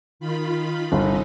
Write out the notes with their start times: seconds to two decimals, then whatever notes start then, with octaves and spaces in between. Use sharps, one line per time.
0.20 D#3 F4 B5
0.92 G1 C3 D#4